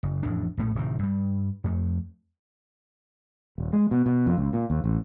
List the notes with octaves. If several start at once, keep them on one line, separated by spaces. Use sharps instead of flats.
F#1
A1 F2 A2 D4
A#1 A2 A3
D1 C3 D#3
G2 G3
F2 A3
D#1
G#3
B2
B2
F2
C#2
A#2
D#2
A1